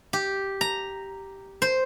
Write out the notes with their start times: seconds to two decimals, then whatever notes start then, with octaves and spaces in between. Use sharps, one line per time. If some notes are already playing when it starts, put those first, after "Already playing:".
0.13 G4
0.61 A#5
1.62 C5